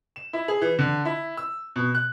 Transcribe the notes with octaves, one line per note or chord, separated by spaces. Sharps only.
E7
E4
G#4
E3
D3
E4
E6
B2
F#6